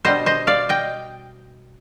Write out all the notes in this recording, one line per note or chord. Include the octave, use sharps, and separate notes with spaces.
B2 G3 D4 C5 D#5
C5 D#5
D5 F5
D#5 G5